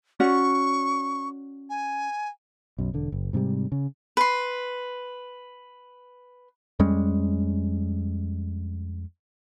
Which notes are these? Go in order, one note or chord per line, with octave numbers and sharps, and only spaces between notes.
C#4 F#4 D5 C#6
G#5
B1 F#2
E1 D3
F#1
G#2 C3 F3 G3
C#3
B4 C6
F2 G3 G#3 C#4